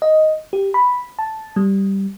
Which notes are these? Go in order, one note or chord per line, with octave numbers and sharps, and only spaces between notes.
D#5
G4
B5
A5
G3